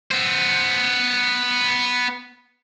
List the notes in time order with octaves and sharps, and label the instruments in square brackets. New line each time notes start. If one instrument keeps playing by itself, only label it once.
[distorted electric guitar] B3 C5